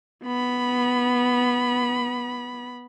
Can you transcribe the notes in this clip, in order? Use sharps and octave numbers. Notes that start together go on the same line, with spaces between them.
B3 B5